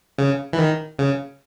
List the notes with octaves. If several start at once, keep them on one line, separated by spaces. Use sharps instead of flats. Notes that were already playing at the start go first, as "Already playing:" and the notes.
C#3
E3
D#3
C#3